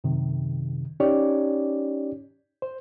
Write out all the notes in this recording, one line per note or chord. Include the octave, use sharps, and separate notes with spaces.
F#2 C3 D#3
C#4 D#4 G4 C#5 D5
C5